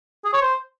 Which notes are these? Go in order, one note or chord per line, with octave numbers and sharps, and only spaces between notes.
G#4
C#5
C5